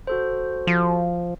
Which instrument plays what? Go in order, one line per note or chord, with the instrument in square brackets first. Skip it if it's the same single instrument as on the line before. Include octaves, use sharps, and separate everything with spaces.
[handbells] F#4 A4 C5
[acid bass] F3